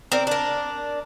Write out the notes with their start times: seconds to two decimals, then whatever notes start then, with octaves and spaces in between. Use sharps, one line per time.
0.12 C4 A#4 D5
0.27 D4 A#4